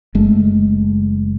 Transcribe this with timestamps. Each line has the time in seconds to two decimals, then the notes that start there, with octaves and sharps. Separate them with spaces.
0.15 F#1 G#3 A3